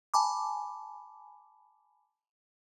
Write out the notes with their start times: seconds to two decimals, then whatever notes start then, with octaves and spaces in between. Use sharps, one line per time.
0.14 G#5 A5 B5 D6